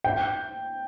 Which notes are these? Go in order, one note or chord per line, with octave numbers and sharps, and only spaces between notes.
G5